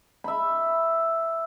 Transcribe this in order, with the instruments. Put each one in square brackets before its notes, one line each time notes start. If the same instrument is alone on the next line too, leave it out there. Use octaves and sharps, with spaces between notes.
[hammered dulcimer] E5 B5